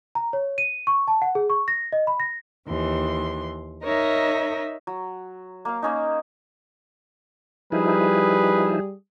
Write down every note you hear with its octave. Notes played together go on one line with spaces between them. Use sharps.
A#5
C#5
D#7
C#6
A5
F#5
G#4
C#6
A#6
D#5
B5
A#6
D#2 E3 C6
D#4 A#4 C#5 D#5 E5
F#3
A#3 F5
A#3 C#4 D#4
F3 G3 D#4 E4 G#4 B4